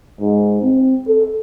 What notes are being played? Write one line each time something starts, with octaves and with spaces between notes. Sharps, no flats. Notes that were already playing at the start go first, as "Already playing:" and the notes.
G#2
C4
A4